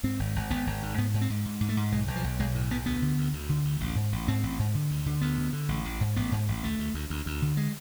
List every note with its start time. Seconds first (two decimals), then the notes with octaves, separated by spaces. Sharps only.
0.03 G#2 C4
0.19 G#1
0.36 G#1
0.50 G#1 B3
0.67 G#1
0.83 G#2
0.98 G#2 B3
1.14 G#2
1.21 C4
1.30 G#2
1.45 G#2
1.61 G#2
1.69 A3
1.77 G#2
1.92 B1 G#3
2.08 B1
2.16 F3
2.24 B1
2.40 B1 G#3
2.55 A2
2.71 B1 B3
2.86 D2 B3
3.02 D3
3.18 D2
3.33 D2
3.49 D3
3.65 D2
3.80 A1
3.96 G#2
4.12 A1
4.28 G#2 C4
4.43 A1
4.59 G#2
4.75 D3
4.91 D2
5.06 D3
5.21 D2 B3
5.38 D3
5.53 D3
5.68 A1
5.85 A1
6.01 G#2
6.16 A1 B3
6.32 G#2
6.48 A1
6.63 D2 A3
6.79 D2
6.94 D2
7.10 D2
7.26 D2
7.42 D3
7.57 G#3